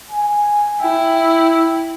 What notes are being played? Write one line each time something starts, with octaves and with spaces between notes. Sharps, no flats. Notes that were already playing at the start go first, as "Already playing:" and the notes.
G#5
E4 G5